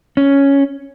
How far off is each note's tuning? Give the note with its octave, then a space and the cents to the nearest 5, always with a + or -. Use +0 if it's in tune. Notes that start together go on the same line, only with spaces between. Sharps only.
C#4 +5